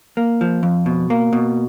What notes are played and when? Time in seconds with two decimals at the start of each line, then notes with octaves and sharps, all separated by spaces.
0.17 A#3
0.41 F3
0.63 F2
0.86 B2
1.10 A#3
1.33 B2